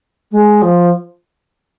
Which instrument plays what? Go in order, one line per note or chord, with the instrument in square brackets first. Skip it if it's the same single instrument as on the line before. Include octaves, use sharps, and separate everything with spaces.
[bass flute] G#3
F3